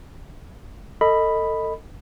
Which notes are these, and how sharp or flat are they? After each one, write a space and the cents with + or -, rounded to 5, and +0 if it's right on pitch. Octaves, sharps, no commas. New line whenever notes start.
A4 +30 D#5 +0 B5 +0